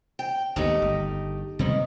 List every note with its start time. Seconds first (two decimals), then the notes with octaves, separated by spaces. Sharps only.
0.19 G5
0.56 G#1 D#2 A3 B3 D#4 G4
0.82 G1
1.59 D#2 C3 D#3 G3 B3